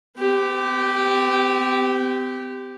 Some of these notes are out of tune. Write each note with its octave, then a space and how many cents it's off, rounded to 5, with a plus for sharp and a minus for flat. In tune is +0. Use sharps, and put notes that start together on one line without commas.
C4 -45 G4 +0